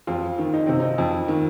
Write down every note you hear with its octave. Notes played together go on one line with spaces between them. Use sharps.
F2 F4
D#3
D#4
C3 C4
D#4
F2
D#3